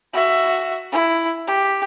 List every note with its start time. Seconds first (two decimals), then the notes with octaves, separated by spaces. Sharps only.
0.14 F#4 E5
0.92 E4
1.47 G4